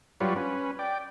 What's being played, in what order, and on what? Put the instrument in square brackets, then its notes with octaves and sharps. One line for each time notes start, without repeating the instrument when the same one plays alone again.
[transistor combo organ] G2 F#3 G3 F4 B4 C#5
C#4 B4
D5 G5